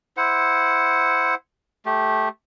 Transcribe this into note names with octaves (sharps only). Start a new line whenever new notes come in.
E4 C5 F#5
A3 G4